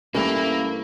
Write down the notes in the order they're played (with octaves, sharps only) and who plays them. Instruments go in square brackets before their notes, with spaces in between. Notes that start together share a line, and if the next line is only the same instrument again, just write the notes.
[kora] G2 E3 A3 [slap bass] G3 C#4 [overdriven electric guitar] A#3 [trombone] E4